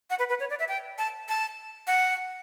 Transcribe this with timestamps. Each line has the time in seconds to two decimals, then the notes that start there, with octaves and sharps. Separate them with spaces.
0.10 F#5
0.19 B4
0.29 B4
0.40 C#5
0.50 D5
0.59 E5
0.69 G5
0.98 A5
1.28 A5
1.87 F#5